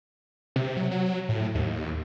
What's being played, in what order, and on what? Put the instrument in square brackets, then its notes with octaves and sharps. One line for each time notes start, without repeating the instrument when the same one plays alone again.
[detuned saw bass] C3
F#3
F#3
A2
D#2